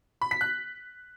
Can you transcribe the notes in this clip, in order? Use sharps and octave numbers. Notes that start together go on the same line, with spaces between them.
B5
B6
F#6